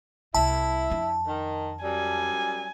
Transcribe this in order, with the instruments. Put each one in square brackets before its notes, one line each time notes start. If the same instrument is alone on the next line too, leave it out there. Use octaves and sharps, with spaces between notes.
[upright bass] C2 C3 [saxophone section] E4 [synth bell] A5
[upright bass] F2 D4
[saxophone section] D#3
[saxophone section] F#2 G3 [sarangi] G#5